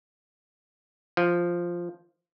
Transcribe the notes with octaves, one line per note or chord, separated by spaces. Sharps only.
F3